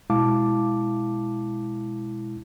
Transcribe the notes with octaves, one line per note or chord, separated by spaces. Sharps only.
B2 G#3 E4 F5 A5 D6